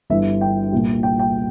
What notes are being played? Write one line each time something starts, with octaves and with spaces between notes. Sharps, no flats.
G1 G2 E3 E5
G5
C2 A#2
G5
G5